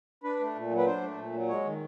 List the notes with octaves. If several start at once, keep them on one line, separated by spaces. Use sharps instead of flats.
D4 B4
A3
A#2
F#3
B4
D4 C5
A3
A#2
F#3
G#3 C#5
D#3